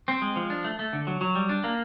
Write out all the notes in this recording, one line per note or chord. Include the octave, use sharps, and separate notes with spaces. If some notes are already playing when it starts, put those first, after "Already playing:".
C4
G#3
F3
D4
A3
A3
D3
F#3
F#3
G3
D4
A#3